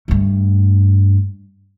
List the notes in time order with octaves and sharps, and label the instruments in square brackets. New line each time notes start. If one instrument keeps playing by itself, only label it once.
[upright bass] G2 A3